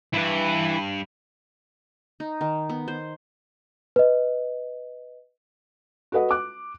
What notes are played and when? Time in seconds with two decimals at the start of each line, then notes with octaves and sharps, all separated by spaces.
0.14 G2 E4 B4
2.20 D#4
2.41 D#3
2.69 B3
2.88 C5
3.96 B4 D#5
6.12 F#4 A4 B4 D#5 F#5
6.31 D6 F#6